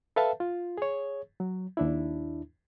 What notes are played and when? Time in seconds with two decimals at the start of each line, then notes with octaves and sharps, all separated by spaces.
0.16 A4 B4 E5 F5 A5
0.40 F4
0.78 G#4 C#5
1.40 F#3
1.77 D#2 D4 E4